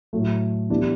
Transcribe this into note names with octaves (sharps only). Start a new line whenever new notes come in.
A2 F#3 A3
E3 B3 D4 G4